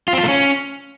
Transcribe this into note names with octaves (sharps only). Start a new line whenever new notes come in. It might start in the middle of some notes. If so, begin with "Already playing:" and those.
F4
C4
F4
A3
C#4